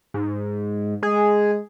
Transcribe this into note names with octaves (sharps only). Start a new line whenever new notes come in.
G#2
G#3 G#4